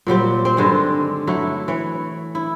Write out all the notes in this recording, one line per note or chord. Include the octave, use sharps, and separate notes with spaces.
A#2 F#3 G3 C4
C4
G2 D3 D#3 G#3
F#3 A3 E4
E3 C#5
E4